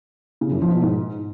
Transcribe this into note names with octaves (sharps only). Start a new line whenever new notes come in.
C#3
F#2
F3
B2
G#2